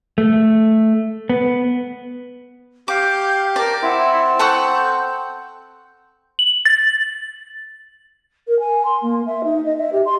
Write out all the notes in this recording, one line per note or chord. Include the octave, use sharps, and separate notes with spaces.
A3
B3
G4 F5 D6 G6
A#4 D5 A5
C4 E4 F#5
A4 F#5 C#6 G6
F#7
A6
A#4
G#5
C6
A#3
E5
D#4
D#5
E5
G4
C6